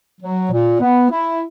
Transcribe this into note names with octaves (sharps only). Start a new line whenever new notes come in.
F#3
A#2
B3
E4